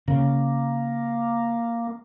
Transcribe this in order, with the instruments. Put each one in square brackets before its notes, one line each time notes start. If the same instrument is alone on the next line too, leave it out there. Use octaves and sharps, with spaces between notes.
[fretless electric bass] C#3 [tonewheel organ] A#3